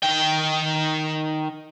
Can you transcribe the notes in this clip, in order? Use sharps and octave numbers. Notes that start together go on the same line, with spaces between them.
D#3 G5